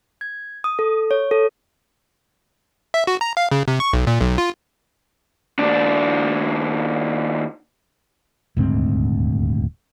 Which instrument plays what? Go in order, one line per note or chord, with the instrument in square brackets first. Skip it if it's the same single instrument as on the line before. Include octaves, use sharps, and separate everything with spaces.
[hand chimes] G#6
D#6
A4
C#5
A4
[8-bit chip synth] E5
F#4
A#5
F5
C#3
C3
C#6
B1
A#2
B1
F4
[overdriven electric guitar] D#2 D4
[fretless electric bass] D#1 D2 G#2 C4